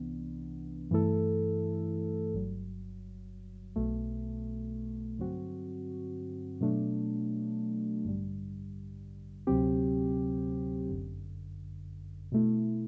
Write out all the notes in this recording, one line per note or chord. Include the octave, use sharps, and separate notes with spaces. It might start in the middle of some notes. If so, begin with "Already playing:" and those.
Already playing: C2 C3 E3 B3 D4
G2 E3 A3 E4 A4
G1 G2 F#3
B1 B2 A3
G2 D3 F#3 C4 F#4
B2 F#3 A3 D4
A1 G2 D3 G3
D2 C3 F#3 C4 G4
G1 F#2 D3
B2 A3 E4